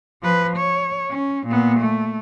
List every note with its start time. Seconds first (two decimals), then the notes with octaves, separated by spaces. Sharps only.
0.23 F3 B4
0.57 C#5
1.10 C#4
1.47 A#2 B3
1.80 A3